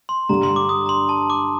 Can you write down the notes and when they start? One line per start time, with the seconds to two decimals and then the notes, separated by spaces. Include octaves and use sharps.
0.09 C6
0.29 G2 D3 G3 A#5
0.43 C6
0.56 D6
0.69 D#6
0.86 A#5
0.89 C6
1.09 A5
1.30 D6